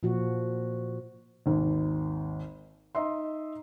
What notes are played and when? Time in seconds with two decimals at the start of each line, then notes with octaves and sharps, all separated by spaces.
0.03 A#2 F3 F#4
1.46 G#1 D#2
2.95 D#4 D#5 E5 C6